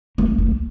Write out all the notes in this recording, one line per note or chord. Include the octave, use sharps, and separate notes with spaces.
A#3
A3